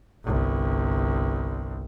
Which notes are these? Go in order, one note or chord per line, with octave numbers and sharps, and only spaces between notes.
G1 C2